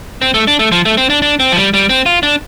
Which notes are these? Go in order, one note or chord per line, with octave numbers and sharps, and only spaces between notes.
C4
A3
D4
A3
F3
A3
C4
D4
D4
C4
F3
G3
G3
C4
F4
D4